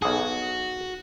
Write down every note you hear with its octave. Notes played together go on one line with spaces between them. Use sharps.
B1 F#4 G#4